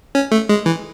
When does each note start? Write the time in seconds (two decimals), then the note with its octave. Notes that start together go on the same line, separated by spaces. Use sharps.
0.15 C#4
0.32 A3
0.49 G#3
0.66 E3